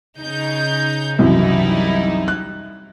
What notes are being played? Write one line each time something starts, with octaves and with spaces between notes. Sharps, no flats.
C#3 D#4 G6
C2 F#2 E3 G3 D#4 E4
F#6